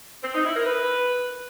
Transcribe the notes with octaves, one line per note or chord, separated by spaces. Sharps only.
C4
D#4
E4
A#4
B4